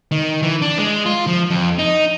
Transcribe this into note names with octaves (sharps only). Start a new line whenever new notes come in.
D#3
E3
D4
G#3
F4
F3
F2
D#4